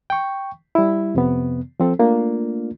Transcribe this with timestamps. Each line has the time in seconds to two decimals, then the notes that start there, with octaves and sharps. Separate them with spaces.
0.10 G5 C#6
0.75 G3 E4
1.15 F2 C3 B3
1.80 F3 C4 A4
1.99 A3 A#3 D4 F4